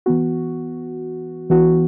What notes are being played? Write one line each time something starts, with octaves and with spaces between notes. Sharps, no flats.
E3 B3 F#4
E3 B3 F#4